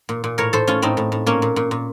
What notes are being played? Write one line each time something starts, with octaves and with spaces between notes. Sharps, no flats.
A#2
A#2
A2 A#4 C#5
A2 A4 C5
A2 C#4 F4
A2 C4 D#4
A2
A2
A#2 A#3 C#4
A#2
A#2
A#2